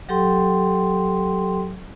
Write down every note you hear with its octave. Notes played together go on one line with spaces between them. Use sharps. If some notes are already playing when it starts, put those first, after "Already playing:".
F#3 G4 A4 G5 C6